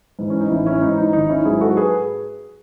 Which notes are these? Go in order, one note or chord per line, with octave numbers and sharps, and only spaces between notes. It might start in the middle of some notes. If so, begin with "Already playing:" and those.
G#2 E3
C#4
D#4
A1 C#4 E4
C#4 E4
G#2 E3 D#4
D#4
G#1 D#4
C#4 E4
G#2 F#3 E4 G#4
F#4 A4
G#4 B4